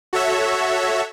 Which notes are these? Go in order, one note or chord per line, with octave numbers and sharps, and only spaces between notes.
F#4 A4 C#5 E5